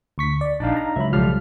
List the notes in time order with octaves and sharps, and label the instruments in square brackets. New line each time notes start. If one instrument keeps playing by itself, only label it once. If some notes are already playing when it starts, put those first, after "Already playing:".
[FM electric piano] D2 C#6 B6
D5
[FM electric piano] A#1 [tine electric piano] D4 D#4 F5 [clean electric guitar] D5
[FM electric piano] A#5
[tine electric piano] C#2 F#3 [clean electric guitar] E5 B5
[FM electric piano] B1 F6 [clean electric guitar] F2 F3 G3